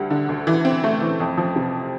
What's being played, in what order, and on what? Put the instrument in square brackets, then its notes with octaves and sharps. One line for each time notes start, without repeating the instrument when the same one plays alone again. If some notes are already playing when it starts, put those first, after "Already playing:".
Already playing: [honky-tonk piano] D2 G3
D3
D2
E3
C4
A3
E3
F2
F3
C3